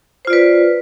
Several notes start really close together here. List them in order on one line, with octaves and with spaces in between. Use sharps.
C5 F4 D5 B4